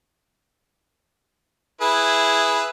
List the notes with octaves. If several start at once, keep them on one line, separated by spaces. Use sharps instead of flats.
E4 G#4 B4